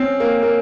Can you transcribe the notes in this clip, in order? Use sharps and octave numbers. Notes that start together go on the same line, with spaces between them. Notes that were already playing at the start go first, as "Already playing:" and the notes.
Already playing: C4 C#4
A#3
A#3